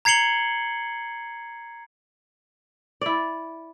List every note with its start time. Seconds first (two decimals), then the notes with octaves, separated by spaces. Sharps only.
0.05 A#5 G#6 C7 C#7 F#7 G7
3.01 E4 D5